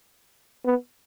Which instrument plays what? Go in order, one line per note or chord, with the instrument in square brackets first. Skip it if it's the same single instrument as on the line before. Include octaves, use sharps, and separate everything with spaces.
[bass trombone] B3